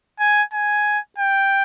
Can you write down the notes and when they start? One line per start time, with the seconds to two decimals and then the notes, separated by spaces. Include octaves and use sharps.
0.20 G#5
0.53 G#5
1.18 G5